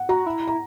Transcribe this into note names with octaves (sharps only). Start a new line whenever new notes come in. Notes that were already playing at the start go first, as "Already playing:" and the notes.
Already playing: F#5
F#4 A#5
E4
A#5